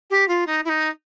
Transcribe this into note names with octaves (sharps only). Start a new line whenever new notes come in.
G4
F4
D#4
E4
D#4